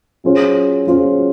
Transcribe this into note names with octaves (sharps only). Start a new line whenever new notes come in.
F#3 C#4 F4 G#4 C5
F#3 C#4 F4 G#4 C5